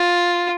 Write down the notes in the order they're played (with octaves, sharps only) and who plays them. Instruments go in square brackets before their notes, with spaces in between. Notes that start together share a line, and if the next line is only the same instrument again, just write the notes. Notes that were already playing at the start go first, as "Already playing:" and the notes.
Already playing: [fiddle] F4